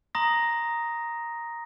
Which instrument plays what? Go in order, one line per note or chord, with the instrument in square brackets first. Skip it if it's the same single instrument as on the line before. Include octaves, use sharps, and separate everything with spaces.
[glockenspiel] A#5 C6 D#6 A#6